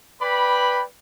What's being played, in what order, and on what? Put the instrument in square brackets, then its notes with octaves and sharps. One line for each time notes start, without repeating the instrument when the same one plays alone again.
[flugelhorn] B4 [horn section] D5 G5 B5